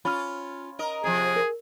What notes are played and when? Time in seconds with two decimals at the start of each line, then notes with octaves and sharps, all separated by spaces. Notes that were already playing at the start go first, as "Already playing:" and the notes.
0.05 C#4 F4 B5 F6
0.79 A#4 D#5
1.04 C3 F3 G#4
1.36 A#4